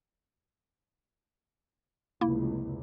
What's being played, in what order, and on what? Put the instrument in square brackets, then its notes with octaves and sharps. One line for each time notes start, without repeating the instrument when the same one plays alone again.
[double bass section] F1 C#2 [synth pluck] A#3 E4